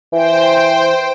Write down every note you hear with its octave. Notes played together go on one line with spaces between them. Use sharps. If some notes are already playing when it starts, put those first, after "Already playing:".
E3 C5 G5